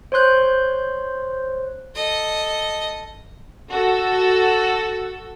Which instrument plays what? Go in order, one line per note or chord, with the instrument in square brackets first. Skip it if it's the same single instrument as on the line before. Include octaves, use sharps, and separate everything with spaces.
[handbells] C5 C#5 C6 F#6 G6
[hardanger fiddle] A4 D#5
[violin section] F#4 A4 E6